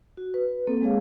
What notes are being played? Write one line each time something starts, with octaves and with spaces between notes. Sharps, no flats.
F#4
B4
A#3 C4 A4
G#3 G#4 C#5 F5